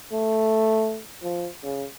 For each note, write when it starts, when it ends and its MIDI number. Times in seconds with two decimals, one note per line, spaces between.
0.12 1.00 57
1.23 1.48 53
1.64 1.86 49